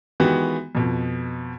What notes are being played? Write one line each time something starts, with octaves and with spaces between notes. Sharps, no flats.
D#3 E3 G#3 B3 F#4 G4
F2 B2